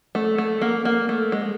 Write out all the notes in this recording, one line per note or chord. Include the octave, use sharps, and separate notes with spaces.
A3
A3
A#3
A#3
A3
G#3